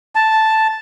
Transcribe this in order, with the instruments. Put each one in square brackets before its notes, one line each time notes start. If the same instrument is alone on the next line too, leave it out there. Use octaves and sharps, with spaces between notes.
[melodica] A5